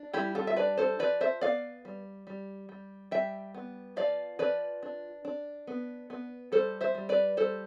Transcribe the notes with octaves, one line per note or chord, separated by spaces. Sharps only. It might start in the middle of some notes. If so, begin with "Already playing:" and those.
Already playing: D4
G3 E4 G4
F4 A4
E5
D4 B4 D5
A4 C5
F3 B4 D5
C5 E5
B3 D5 F5
G3
G3
G3
G3 E5 G5
B3
F3 D5 F5
F3 B4 D5
D4
D4
B3
B3
G3 A4 C5
C5 E5
G3
B4 D5
G3 A4 C5